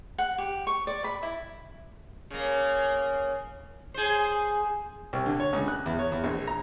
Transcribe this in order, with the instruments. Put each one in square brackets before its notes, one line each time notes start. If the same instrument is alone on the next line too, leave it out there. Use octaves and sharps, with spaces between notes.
[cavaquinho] F#5
G4
C#6
D5
B5
E4
[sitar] C#3 A#3
G#4 C5
[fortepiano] C2
D3
C#5
C#2
F#6
E2
C#5
E2
A#1
A#5